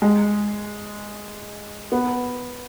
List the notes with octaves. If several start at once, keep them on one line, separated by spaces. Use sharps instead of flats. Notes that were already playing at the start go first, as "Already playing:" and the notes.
G#3
B3